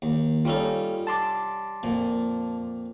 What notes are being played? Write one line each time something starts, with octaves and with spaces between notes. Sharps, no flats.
D#2
G3 C#4 D#4 F4 A4
A5 C6 D6
F2 A#2